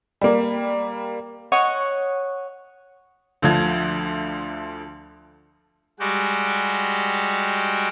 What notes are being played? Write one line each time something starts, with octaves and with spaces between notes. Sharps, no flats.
G3 A#3
C#5 D#5 F#5 C#6
D2 D3 F3 G#6
G3 G#3 F#4 G4